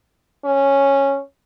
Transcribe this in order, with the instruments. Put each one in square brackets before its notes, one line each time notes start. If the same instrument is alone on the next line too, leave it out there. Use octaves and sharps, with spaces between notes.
[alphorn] C#4